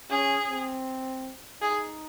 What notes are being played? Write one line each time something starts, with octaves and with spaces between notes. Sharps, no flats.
C#4 G#4
C4
D#4 G#4